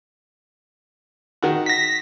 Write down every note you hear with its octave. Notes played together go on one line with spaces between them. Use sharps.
D#3 F#4
A#6 B6